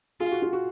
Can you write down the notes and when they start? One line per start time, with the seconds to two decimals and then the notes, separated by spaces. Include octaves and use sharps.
0.20 F4 G#4
0.31 F#4
0.42 F4
0.53 F#4